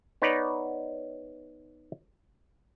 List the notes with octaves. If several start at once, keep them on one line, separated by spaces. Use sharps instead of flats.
B3 D#4 B4 C#5 D5